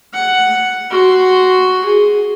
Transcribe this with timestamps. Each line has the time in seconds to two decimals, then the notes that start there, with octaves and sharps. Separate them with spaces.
0.13 F#5
0.91 F#4 C6
1.85 G#4